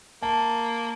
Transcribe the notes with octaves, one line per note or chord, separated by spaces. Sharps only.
A#3 A5